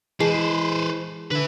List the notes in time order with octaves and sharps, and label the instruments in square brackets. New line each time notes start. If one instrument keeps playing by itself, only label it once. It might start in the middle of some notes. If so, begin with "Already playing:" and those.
[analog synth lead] E3 [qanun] G#3 [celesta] G#4 A5 C7 [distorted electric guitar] B4 C5
[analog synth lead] D3 [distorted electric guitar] B4 E5